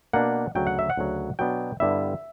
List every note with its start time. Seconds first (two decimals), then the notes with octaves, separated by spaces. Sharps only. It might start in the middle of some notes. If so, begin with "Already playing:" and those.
0.13 B2 A#3 D4 F#5
0.55 D2 C#3 F#3 G5
0.67 F#5
0.79 E5
0.90 F#5
0.97 D2 C#3 F#3
1.39 B2 F#3 B3 D4 G5
1.80 G2 D3 G3 B3 E4 E5